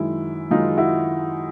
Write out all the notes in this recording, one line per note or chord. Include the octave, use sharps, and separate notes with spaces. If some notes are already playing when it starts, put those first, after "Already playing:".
Already playing: F#2 D#3 G#3 E4
F#2 D#3 G#3 D#4 F4
E4 F#4